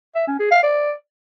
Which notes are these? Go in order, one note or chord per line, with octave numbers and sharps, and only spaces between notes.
E5
C#4
G#4
F5
D5